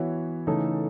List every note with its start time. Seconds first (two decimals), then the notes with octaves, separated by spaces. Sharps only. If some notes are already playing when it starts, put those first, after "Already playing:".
Already playing: E3 B3 F#4 C#5 E5
0.47 C#3 E3 A3 D#4 A4